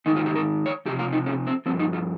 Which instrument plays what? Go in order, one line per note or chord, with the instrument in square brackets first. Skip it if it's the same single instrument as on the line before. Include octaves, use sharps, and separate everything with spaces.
[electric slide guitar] G#2 D#3 D#4
F4
G4
A#4
C#5
F2 C3 F3 G4
F4
D#4
C#4
C4
G2 F3 C4
D#4
F4